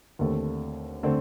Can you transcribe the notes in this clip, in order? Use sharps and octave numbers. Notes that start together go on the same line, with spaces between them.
D#2 D3 A3 C4
D3 A3 C4